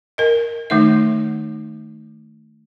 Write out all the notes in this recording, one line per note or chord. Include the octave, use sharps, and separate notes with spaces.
A#4 D#5
D#3 A3 D#4 E5